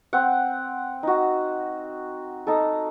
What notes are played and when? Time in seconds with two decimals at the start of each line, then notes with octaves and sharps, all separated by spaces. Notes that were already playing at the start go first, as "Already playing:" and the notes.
0.13 C4 F#5
1.03 D#4 F#4
2.47 D#4 A4